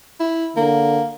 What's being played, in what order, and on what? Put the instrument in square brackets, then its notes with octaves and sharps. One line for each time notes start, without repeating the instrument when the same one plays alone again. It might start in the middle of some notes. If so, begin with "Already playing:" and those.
[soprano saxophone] E4
[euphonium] D3 [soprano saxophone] A#3